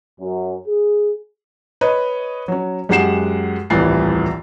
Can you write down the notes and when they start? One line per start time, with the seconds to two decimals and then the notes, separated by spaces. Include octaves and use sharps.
0.21 F#2
0.67 G#4
1.81 B4 C#5 D#5
2.48 F#3 C#4
2.89 F#2 G#3 G4 F#5 C7 E7
3.70 D#1 C2 A2 E3 A6 C7